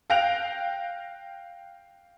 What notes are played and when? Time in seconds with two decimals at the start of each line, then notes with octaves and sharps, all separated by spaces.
0.10 F5 G5 F#6 A#6 D7 F7